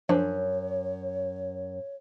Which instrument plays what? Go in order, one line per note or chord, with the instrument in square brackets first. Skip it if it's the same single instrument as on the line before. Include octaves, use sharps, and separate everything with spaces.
[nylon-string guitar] F#2 [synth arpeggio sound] F3 D4 C5 [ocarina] C#5